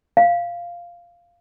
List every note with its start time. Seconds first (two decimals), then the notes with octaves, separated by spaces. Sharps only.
0.17 F5